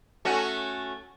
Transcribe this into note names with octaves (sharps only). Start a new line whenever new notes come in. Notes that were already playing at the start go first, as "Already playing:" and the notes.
A3 C#4 F#4